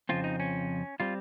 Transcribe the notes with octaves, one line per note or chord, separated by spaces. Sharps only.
F2 C#3 F3 C4 F4
D#4
C#4
G3 C4 F4